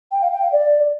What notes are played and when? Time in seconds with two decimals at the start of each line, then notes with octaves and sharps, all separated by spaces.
0.12 G5
0.22 F5
0.32 G5
0.42 F5
0.52 D5